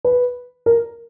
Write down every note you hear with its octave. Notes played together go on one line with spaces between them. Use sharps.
B4
A#4